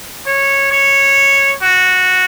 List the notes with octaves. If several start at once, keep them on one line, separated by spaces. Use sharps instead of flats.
C#5
C#5
F#4